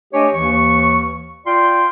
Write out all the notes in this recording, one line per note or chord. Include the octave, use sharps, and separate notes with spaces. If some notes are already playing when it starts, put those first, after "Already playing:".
A3 D4 G4 C#5 D#5 G#5
D#2 E3 C#6
F4 D5 G5 C6